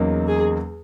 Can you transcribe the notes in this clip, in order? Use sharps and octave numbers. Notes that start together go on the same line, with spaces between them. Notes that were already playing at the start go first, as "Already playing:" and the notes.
Already playing: E2 C#3 F#3 A#3 D#4
G#4